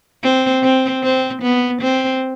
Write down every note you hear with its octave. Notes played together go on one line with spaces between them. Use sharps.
C4
C4
C4
B3
C4